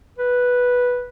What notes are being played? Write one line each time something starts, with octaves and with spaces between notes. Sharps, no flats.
B4